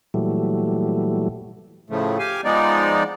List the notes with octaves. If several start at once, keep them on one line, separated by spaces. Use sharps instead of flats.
A#2 E3 F#3 G3 A3
A2 C#3 F3 A3
G4 F5 G#5
F3 G#3 B3 D#4 D5